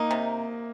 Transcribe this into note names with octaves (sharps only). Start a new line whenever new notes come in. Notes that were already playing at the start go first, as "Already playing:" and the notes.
Already playing: A#3 D#4
C3